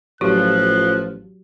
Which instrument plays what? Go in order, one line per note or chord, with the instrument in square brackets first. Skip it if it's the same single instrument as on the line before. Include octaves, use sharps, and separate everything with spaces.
[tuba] A1 [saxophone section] F3 [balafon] F#3 F#4 G4 [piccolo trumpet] F#6